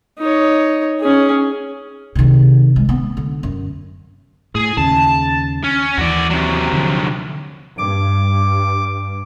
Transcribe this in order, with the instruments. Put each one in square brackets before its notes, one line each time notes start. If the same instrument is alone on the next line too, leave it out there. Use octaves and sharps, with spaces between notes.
[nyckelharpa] D#4 C#5
C#4 G#4
[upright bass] C3 D#3
G#3
B3
D3
F#2
[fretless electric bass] A2 [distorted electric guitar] G#4
[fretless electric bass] D#2 C#3 [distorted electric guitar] A5
[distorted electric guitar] C#4
[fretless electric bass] D#2 E3 [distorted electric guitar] F#4 D5
[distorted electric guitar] C3 F#3
[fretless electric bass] D3 F3
[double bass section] G2 [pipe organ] D6